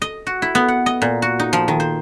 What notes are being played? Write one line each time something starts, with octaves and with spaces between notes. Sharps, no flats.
D#5
F#4
E4
B3
F#5
D#5
A#2
F#4
D#4
F3
D#3
C5